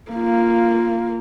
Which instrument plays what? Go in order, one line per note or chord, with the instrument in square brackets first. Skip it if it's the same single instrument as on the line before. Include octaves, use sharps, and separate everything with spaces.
[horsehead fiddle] A#3 F4